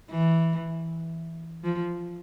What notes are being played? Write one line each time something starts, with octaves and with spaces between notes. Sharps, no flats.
E3
F3